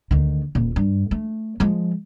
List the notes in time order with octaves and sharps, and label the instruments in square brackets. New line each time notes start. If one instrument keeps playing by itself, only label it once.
[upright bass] D2 D#3
D#1 A#2
G2
A3
F3 G#3